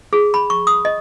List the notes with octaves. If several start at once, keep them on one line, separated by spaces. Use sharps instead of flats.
G#4
B5
C#6
D#6
D#5